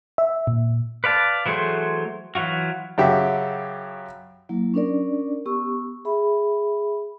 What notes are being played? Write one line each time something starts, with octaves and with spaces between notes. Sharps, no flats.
E5
A#2
B4 D5 F5 A5
E3 F#3 A3 G#4 C5
E3 F#3 F4 F#4
F#2 C#3 G4 E5
F#3 A#3 E4
C#4 D4 A#4 D5
B3 G4 C#6 E6
G#4 E5 B5